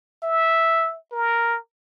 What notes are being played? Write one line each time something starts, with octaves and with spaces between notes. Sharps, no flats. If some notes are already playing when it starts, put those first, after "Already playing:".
E5
A#4